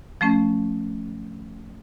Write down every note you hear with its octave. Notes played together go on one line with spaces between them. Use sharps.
F3 A3 C#4